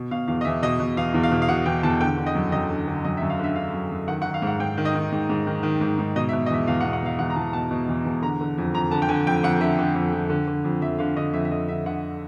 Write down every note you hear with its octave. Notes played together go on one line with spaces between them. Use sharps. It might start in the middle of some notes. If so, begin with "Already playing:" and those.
Already playing: B2
B2 F5
E2 F5
D#5
E2 E5
B2 D#5
B2
E2 F5
E2
F5
B2
F5
B2 F#5
E2 G5
E2 A5
D3 G5
D3
D#5
F#2
F#2 D#5
D3
D3
F#2 D#5
E5
F#2
F5
D3 E5
D3 F5
F#2
F#2
D#3 F#5
F#5
D#3
F5
G#2 F#5
G#2 G5
D#3
D#5
D#3
G#2
G#2
D#3
D#3
G#2
G#2
B2 D#5
E5
B2
D#5
E2 E5
E2 F5
F#5
B2
F#5
B2 F5
E2 F#5
A#5
E2 A5
B2 A5
B2
E2
E2
D3 A#5
D3
F2
F2 A#5
D3 A5
G5
D3 G#5
F2 G5
F2 F#5
D3 E5
D3
F2
F2
D3
D3
F2
F2 E5
D3 F5
D3 D#5
F2 E5
E5
F2 D#5
D3 E5
D3 F#5